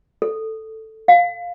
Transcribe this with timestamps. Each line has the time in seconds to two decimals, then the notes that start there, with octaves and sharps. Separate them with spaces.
0.22 A4
1.08 F5